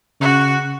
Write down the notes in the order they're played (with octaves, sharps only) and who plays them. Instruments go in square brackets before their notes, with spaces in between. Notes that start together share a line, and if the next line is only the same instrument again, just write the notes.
[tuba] C#3 [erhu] F#4